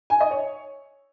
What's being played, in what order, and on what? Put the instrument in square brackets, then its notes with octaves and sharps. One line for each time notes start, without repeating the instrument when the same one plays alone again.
[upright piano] G#5
D#5
C#5